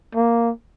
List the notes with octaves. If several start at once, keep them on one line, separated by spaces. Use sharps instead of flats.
A#3